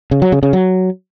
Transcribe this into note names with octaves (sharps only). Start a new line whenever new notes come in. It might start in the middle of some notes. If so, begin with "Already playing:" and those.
C#3
F#3
C#3
C#3
F#3